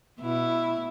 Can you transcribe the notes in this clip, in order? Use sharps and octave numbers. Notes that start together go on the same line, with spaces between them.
B2 E4